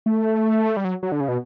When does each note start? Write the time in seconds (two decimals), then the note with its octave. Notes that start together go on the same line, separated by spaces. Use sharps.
0.06 A3
0.77 G3
0.85 F#3
1.03 F#3
1.12 D3
1.20 C#3
1.28 B2